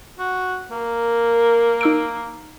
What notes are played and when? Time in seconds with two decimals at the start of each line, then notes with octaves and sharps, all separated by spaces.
0.19 F#4
0.71 A#3 A#4
1.81 D#4 E6 D7